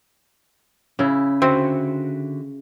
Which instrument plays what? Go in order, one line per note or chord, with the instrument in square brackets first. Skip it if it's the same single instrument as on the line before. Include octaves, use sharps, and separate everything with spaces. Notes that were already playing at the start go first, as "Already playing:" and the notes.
[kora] C#3 E4
[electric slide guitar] D3 F#4 E5 [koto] C4